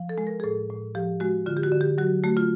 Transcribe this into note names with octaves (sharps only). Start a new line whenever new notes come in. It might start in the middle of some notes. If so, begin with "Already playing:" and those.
Already playing: F3
A4
G#3
A#4
G#4
A2 A4
A2
F3 G4
G#3 F#4
D3 F4
G4
F#4
D3
G4
F#3 F#4
A3 F#4
F4